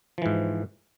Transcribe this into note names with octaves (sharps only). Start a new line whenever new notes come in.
G#2 E3 F3